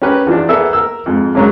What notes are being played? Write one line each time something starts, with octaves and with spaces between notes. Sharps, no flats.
C#4 G4 A#4 B4
E2 F3 D4
A#3 B3 G#4 A4 E5
A#4 E6
F2 G#2
G#2 C#3 F#3 G#3 A#3